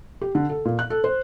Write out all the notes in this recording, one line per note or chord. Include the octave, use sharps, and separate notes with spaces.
G4
D3
A4
A#2
F#6
A4
C5